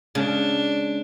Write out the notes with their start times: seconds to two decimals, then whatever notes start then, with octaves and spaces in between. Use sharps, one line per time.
0.15 C#3 G#3 D4